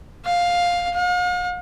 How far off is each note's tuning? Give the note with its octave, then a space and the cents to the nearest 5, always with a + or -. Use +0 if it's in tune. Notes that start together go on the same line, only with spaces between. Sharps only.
F5 +10
F5 +45